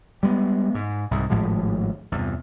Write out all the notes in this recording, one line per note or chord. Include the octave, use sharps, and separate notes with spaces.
G3 G#3 B3
G#2
C2 G#2
G#1 A2 F3 G#3
E2 G2 C3